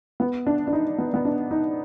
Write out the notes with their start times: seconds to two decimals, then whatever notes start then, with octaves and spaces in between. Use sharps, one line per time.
0.20 B3
0.47 D4
0.67 D4
0.73 D#4
0.98 B3
1.14 B3
1.25 D4
1.51 D#4